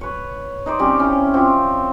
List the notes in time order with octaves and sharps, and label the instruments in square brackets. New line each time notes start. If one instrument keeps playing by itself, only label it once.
[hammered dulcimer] B4 C#5
D#4 C5 D5
G3 C4 C#4 G4
C#4 E4
F3 C4 G4 C#5